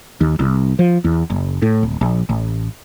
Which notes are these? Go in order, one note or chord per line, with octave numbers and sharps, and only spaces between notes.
D#2
C2
F3
E2
F#1
A2
D1
A#1
A1